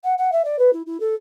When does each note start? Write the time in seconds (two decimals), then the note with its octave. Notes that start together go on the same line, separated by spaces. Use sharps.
0.03 F#5
0.18 F#5
0.32 E5
0.44 D5
0.58 B4
0.73 E4
0.86 E4
1.00 A4